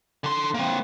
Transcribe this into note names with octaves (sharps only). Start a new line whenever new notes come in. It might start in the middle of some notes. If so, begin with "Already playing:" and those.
D3 C6
A#3 C4